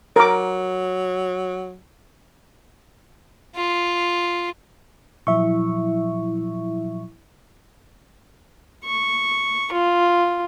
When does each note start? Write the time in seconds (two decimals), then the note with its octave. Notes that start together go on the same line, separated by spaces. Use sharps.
0.16 F#3 A#4 D6
3.56 F4
5.27 A#2 F3 F#3 E4 E5 C#6
8.84 C#6
9.72 F4